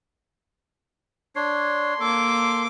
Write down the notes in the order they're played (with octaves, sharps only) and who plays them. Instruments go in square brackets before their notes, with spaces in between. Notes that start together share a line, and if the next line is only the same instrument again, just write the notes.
[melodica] D4 C#5 [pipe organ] C6
[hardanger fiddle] A#3 D6 [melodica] A4